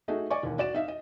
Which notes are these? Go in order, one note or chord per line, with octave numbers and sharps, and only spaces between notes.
A3 D#4 F#4 G#4
D5 D#5 G#5 C#6 D6
E1 D#2
F#4 D5 E7
D#4 E5 F5
D#5